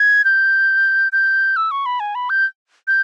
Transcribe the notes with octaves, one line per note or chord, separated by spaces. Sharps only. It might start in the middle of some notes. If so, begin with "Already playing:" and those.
Already playing: G#6
G6
G6
E6
C#6
B5
G#5
B5
G6
G6